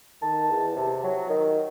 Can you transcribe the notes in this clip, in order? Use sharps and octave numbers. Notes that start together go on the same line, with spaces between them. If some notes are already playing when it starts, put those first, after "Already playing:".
D#3 A5
E2
C3
F#3
D#3